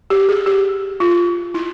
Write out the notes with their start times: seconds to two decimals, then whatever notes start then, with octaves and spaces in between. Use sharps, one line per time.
0.10 G4
0.29 G#4
0.46 G4
1.00 F4
1.54 E4